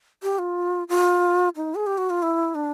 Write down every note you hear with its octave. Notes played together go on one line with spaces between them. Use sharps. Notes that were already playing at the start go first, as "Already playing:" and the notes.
G4
F4
F4
D#4
G#4
G4
F#4
F4
E4
D4